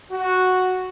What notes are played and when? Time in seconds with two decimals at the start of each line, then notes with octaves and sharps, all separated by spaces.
0.12 F#4